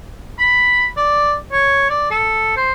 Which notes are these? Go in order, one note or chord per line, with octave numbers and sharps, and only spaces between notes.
B5
D5
C#5
D5
A4
C5